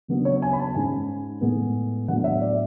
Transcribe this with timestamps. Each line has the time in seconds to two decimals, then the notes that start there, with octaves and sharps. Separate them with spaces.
0.08 C#3 F#3 B3 D4
0.25 C#5
0.42 G#5
0.53 B5
0.59 A5
0.74 G#2 G#3 C#4 G#5
1.41 A2 G#3 B3
2.08 A2 F#3 B3 D4 F#5
2.24 E5
2.41 D5